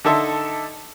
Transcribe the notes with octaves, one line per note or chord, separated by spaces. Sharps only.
D3 D#4 A4 E5 C6